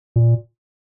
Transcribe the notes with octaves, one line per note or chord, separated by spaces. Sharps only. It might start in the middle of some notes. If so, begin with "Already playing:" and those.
A#2